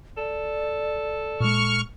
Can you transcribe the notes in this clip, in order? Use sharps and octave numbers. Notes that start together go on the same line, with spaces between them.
A4 D5
A#2 G#3 C#6 F6